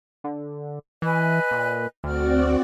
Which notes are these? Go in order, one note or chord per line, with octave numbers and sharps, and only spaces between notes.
D3
E3 B4 D#5 G#5
A#2
D2 C4 F#4 D5 F6